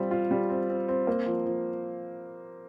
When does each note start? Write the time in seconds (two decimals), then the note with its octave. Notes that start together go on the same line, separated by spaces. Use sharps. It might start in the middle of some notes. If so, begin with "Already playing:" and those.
Already playing: G3 C4 F4
0.11 F4
0.31 G3
0.50 C4
0.69 C4
0.88 C4
1.07 A#3
1.26 F3
1.46 F3